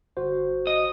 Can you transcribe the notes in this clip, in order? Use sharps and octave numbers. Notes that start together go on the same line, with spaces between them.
G1 F#4 C5
D#5